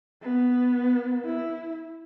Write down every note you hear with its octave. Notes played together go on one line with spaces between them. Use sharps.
B3
E4